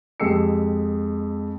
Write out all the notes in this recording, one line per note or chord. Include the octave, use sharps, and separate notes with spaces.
F2 G#3 G4 E6 C7 C#7